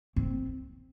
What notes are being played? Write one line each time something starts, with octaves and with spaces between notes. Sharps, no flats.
C4